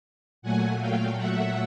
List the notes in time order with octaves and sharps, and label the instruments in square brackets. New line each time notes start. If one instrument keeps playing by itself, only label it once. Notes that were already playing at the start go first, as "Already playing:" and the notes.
[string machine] A#2 F#3 A3 F#5 G#5
F5 G5
E5 F#5